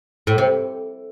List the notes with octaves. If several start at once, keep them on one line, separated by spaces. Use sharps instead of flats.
A2
C3